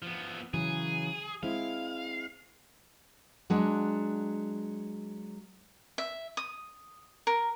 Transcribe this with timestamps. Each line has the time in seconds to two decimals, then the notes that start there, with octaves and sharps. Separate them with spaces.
0.02 F3 B3
0.54 C#3 E3 F#3 G#4
1.43 G#3 C4 E4 F5
3.50 F#3 G#3 D4
5.98 E5
6.37 D#6
7.27 A#4